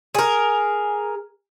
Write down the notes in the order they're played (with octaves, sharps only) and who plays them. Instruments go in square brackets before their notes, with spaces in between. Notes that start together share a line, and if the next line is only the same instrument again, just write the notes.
[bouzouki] G#4 A#4